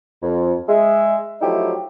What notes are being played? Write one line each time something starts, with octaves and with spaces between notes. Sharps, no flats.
F2
G#3 E5
F3 F#3 A3 D#4 E4 G4